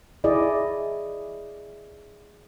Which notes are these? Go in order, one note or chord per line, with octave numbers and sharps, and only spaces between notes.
E4 G#4 D5 D#5